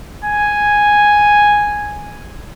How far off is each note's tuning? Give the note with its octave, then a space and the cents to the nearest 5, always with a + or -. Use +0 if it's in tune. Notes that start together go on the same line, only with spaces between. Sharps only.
G#5 +0